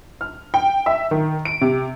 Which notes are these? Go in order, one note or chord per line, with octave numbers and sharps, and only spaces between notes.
F6
G5
E5
D#3
D7
C3